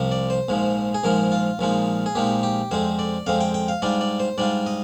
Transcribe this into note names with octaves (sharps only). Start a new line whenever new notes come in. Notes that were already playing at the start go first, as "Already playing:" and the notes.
Already playing: C2 C3 F3
D5
C5
A#1 G#2 F3 G#3
G#4
A#1 G#2 F3 G#3 A#4
F4
A#1 A#2 F3 G#3 D#4
G#4
A#1 A#2 F3 G#3 D#4 G4
G4
F2 D3 G#3 C4 C5
D5
F2 D3 G#3 C4 F5
G5
G5
F5
G#2 G3 D4 F4 D5
D5
C5
G#2 G3 D4 F4 D5
D#5